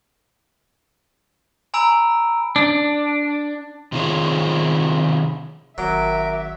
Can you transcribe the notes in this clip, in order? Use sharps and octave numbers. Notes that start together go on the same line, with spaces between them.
G#5 A#5 B5 E6 D7
D4
C3 D#3 C4 F4 G#4 C#5
G#1 F#3 A#4 E5 D6